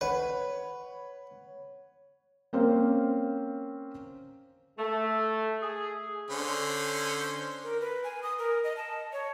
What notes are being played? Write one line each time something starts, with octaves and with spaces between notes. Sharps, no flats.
B4 C#5 F#5 B5
A#3 C4 C#4 C5 F5
A3
G#4
D3 C#4 C5
A#4
B4
G#5
D#6
A#4
D#5
A5
C#5